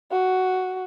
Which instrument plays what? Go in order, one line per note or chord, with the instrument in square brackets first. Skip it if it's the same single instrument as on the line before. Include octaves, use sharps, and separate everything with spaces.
[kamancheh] F#4